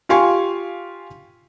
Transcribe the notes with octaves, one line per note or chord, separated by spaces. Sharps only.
F4 G4 F5 G#5 C6 C#6